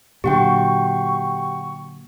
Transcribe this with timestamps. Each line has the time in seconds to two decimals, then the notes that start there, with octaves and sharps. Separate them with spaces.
0.24 A#2 D3 F#3 G4 F#5 G5 C#6